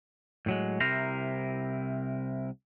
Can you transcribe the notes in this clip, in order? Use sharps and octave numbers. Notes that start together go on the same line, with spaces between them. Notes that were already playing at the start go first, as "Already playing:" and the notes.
A2 F#3 G#3
C2 C3 E4 A#4 C5 A#5